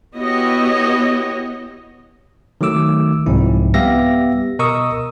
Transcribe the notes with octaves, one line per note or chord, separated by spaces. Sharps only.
B3 E4 F#4 G4 C#5 D#5
D#3 F#3 A3 D6 E6
C2 G#2 F3 C4 E4
G3 B3 G4 E5 F5 A#6
B2 A#4 D#5 C#6 D#6 E6